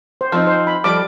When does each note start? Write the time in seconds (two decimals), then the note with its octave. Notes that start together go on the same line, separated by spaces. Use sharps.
0.21 C5
0.32 F3 C4 D#4
0.47 C5
0.67 B5
0.84 F3 G3 A4 D6